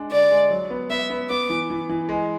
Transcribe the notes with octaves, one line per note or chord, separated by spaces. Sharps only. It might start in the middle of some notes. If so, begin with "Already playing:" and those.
Already playing: G#3 D4
D3 D5
G#3
F#3
B3
B3 E5
B3
B3 D6
E3
E3
E3
G#3